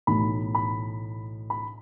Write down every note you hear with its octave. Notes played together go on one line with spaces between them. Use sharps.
B1 A2 E3 A3 B5
B5
B5